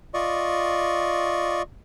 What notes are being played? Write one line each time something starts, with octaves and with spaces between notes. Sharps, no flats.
F4 D5 D#5 C#6